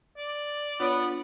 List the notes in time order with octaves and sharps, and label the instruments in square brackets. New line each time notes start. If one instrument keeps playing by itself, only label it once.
[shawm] D5
[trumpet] B3 [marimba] D4 F4 C#5